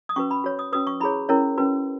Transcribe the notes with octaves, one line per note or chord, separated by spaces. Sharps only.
D#6
C#4 F#4 B4 C#6
B5
F#4 C#5
D#6
C#4 F#4 B4 D#6
C#6
E4 G#4 C#5 B5
C#4 E4 A#4 C#5
C#4 F#4 B4